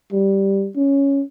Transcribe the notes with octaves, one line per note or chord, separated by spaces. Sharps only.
G3
C#4